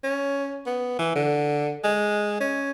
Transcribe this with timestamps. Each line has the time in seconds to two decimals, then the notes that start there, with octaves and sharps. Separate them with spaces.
0.03 C#4
0.66 B3
0.99 E3
1.15 D3
1.84 G#3
2.40 C#4